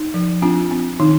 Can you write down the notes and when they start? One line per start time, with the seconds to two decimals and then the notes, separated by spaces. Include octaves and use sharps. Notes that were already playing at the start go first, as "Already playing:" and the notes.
Already playing: D#4
0.14 F3
0.42 C4 D4 F4
0.71 C4
1.00 D#3 D#4